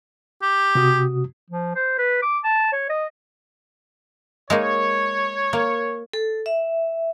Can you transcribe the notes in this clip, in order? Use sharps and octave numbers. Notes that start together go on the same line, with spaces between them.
G4
C3 F#4 D#6
F3
C5
B4
D6
A5
C#5
D#5
G#3 A#3 D#4 C#5
A#3
A4
E5